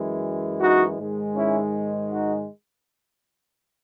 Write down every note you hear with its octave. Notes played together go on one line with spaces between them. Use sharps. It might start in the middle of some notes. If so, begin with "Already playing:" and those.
Already playing: F#2 E3 G#3
D#4 F#4
G#2 D#3 G#3
C#4 E4
D#4 F#4